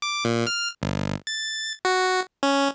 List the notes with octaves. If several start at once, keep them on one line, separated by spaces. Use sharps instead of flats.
D6
A#2
F6
G1
A6
F#4
C#4